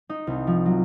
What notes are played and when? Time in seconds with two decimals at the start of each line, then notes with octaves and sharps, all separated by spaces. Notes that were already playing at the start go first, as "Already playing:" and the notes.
0.09 D#4
0.27 C2
0.47 F3
0.66 F#3